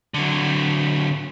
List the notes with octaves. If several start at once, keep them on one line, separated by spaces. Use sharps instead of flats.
D3 F#3